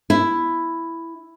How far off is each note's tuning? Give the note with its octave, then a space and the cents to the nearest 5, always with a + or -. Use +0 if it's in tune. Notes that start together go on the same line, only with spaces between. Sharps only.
E4 +5